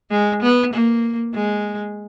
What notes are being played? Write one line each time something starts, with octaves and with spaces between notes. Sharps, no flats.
G#3
B3
A#3
G#3